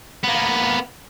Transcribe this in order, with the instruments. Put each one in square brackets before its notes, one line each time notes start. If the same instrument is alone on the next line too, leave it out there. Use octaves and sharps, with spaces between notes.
[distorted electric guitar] A#3 B3